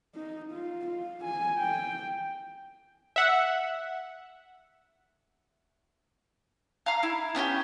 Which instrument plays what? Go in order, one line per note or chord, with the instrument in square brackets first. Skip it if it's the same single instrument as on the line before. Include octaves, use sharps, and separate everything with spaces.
[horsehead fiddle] D#4
F4
F4
G#5
G5
[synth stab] E5 F#5
[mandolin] F5 A#5 F6
E4
B3 C#4 F4 G4